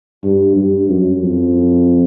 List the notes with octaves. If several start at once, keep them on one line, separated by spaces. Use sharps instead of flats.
G2
G2
F#2
F2